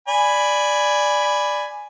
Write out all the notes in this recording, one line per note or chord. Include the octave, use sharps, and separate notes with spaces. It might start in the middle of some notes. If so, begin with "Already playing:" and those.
D5 G#5 B5